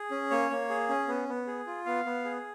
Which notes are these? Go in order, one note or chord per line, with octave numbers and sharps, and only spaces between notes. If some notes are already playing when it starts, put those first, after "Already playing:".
Already playing: G#4
C#4
A#3 C#5
A#3
G#4
C#4
B3
B3
G#4
F4
B3 F5
B3
G#4